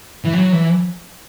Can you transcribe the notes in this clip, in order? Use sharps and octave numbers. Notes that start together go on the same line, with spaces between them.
E3
F#3
E3